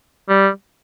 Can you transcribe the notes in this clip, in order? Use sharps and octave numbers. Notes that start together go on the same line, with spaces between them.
G3